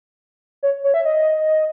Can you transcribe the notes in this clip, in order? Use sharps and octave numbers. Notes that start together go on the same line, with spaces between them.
C#5
C#5
E5
D#5